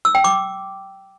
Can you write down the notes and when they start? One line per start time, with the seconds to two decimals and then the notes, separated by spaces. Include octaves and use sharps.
0.05 E6
0.15 G5
0.24 D6